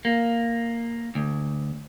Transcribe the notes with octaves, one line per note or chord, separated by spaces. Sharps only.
A#3
D2